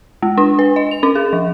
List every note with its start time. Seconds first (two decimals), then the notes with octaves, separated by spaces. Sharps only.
0.22 G#3
0.38 D4
0.59 B4
0.76 D#5
0.91 F7
1.03 C#4
1.15 G#4
1.33 F3